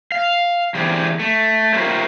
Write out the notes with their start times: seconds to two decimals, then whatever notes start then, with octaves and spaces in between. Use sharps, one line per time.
0.12 F5
0.75 E3 G4 G#4 C5 D5
1.19 A3
1.74 F4 G4 A#4 C5 C#5 E5